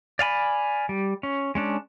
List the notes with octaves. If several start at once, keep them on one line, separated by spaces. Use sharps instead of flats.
D5 F5 G#5 B5
G3
C#4
G#3 C#4 D4